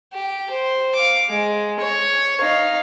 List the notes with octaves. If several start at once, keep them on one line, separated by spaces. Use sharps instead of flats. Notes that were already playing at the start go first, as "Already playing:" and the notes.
G4
C5
F5 D6
G#3
C#5
D#4 F5